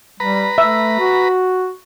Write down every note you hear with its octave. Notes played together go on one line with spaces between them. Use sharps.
G3 B4 A#5 B5
A3 E5
F#4